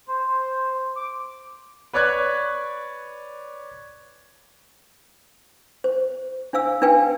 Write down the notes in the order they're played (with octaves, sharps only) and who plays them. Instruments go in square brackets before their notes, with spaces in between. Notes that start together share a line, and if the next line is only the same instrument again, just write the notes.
[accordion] C5
D6
[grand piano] B4 C#5 D5 F#6 G#6
[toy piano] C5
D4 C5 F5 E6
D4 D#4 B4 F5 G5 G#5